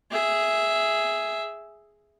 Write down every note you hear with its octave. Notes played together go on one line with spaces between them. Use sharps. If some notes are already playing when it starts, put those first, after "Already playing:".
G#4 E5